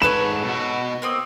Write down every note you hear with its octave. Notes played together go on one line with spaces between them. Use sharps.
G#2 A4 B4 C#5 B5 E7
B2 F#4
A#3 C4 D#6